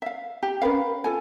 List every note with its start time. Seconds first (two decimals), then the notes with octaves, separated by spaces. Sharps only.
0.02 E5 F5
0.43 G4
0.62 C#4 A#4 B4 F5
1.04 F4 A4 G#5